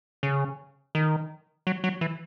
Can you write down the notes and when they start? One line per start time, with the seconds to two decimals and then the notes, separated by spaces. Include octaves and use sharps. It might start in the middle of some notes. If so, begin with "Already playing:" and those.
0.23 C#3
0.95 D#3
1.67 F#3
1.84 F#3
2.01 E3